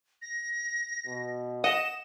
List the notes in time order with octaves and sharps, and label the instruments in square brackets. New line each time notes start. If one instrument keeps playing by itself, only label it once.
[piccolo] A#6
[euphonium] B2
[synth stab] D#5 [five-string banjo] F#5 [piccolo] E7